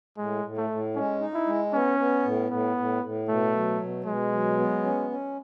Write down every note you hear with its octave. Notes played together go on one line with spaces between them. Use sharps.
A2 G#3
A2
A3
A2
G#3 C#4
D#4
E4
G#3
B3 C#4
B3
A2
A2 B3
A2
A2
B2 A3
F#3
B2
B2 G#3
F#3
B3
C#4
C#4